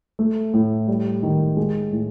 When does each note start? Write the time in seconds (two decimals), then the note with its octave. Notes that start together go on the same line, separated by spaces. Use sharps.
0.19 A3
0.54 A2
0.88 G3
1.23 D#3
1.57 G#3
1.92 A2